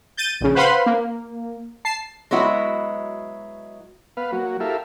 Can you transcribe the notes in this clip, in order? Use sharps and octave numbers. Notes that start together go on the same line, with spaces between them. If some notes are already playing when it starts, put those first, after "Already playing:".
G6 A6 D#7
A#1 C#3
B4 C5 F5 F#5 B5 C6
A#3
A5 C7
F#3 G#3 B3 E4 F#4
B3 B4 F5
F#3 A#3 F#4
E4 G4 A4 A#4 E5 F5